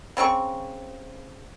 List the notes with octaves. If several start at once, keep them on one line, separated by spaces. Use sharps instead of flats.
C#3 C4 D4 C#6